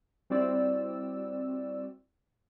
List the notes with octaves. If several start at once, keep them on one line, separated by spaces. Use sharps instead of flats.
G3 C4 E4 F#4 D5 E6